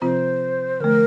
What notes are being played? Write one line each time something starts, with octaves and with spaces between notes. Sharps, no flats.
C3 F3 C4 F4 C5
D3 F3 A3 A#4